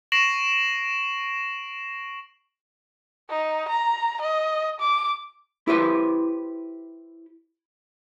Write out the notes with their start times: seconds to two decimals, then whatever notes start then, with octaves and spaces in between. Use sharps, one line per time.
0.12 C#6 A#6 C7 D7 E7 F#7
3.30 D#4
3.69 A#5
4.22 D#5
4.80 D6
5.68 E4 G4 B4 C5